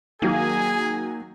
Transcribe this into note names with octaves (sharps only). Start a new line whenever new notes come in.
D#3 F#3 A#3 G#4 G#5